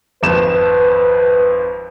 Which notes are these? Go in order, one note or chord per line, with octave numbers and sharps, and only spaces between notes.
G#1 F2 B4 E7